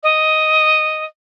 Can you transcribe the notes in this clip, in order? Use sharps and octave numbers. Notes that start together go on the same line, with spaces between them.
D#5